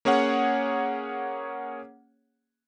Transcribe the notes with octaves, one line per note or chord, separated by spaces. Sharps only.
A#3 C#4 G#4 C#5 F#5